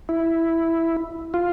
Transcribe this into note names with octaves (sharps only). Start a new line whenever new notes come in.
E4
F4